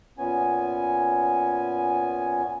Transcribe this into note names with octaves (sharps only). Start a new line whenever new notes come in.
A#2 B3 C#4 G#5